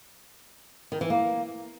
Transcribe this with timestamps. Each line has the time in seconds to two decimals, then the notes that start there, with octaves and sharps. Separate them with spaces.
0.92 D#3
1.01 E3
1.10 A#3